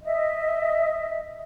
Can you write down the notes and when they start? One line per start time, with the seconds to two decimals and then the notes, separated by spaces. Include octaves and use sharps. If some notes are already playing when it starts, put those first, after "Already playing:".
0.01 D#5 E5